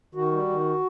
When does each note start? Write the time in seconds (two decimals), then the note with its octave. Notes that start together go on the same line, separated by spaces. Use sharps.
0.15 D#3 F#4
0.32 G3
0.49 D#3